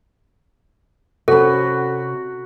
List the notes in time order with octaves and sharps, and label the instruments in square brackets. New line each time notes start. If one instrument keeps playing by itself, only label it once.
[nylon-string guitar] C3 C#4 [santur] F#4 B5 [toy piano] A4